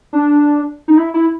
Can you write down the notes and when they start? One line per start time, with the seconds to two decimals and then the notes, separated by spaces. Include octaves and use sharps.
0.13 D4
0.88 D#4
0.97 E4
1.14 E4